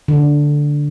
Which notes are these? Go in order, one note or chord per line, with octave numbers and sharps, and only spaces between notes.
D3